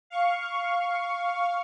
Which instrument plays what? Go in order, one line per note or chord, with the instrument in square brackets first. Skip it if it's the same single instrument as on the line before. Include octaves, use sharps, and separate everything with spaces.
[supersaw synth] F5 C#6